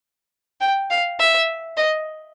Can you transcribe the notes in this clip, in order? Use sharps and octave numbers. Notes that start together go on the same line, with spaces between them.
G5
F5
E5
D#5